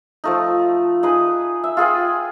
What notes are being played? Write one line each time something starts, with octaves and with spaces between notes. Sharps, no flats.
F3 A3 D#4
D#4 G#4 B4
E5
F4 G#4 B4 G5